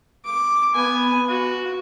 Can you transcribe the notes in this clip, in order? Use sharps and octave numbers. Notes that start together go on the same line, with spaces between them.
D6
B3 G#5
F#4